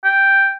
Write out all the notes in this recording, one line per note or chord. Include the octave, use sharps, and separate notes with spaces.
G5